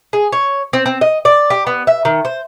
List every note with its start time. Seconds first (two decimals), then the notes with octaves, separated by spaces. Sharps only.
0.13 G#4
0.32 C#5
0.73 C4
0.86 C4
1.01 D#5
1.25 D5
1.50 G4
1.67 B3
1.87 E5
2.05 D#3
2.25 C5